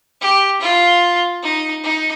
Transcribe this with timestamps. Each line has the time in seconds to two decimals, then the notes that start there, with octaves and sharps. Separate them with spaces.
0.21 G4
0.61 F4
1.43 D#4
1.84 D#4